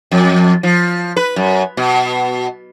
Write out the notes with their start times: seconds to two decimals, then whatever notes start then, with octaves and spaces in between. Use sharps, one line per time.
0.11 F2
0.63 F3
1.16 B4
1.36 F#2
1.77 B2